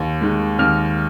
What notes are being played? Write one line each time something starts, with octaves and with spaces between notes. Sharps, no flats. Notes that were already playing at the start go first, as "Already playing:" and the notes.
Already playing: D#2
D#3 G#3
D#2 F6